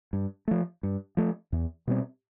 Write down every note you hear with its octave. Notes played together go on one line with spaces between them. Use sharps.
G2
F3 A3
G2
F3 A3
E2
B2 G3 C4